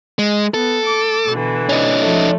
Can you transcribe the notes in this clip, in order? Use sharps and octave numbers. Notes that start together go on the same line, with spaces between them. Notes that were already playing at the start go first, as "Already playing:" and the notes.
G#3
B3 A4
D6
B2 D3 E3
C#4 D#4
F3 A3